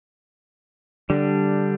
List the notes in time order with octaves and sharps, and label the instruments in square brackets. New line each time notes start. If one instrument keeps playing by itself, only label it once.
[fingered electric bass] D3 [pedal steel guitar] G3 D4